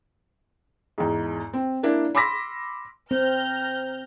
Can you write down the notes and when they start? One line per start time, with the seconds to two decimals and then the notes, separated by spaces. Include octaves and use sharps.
0.98 E2 G#2
1.53 C4
1.83 A#3 D4 E4 A#4
2.15 B5 C6 D6 E6 A#6 B6
3.11 C4 A#5 F6 G6